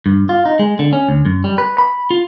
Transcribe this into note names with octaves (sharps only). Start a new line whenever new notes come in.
G2
F4
D#4
G#3
D3
C#4
D2
F#2
G3
B4
B5
F4